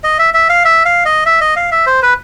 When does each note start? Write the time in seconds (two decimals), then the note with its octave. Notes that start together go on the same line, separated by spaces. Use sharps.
0.04 D#5
0.19 E5
0.34 E5
0.49 F5
0.65 E5
0.85 F5
1.05 D#5
1.26 E5
1.41 D#5
1.56 F5
1.72 E5
1.86 C5
2.02 B4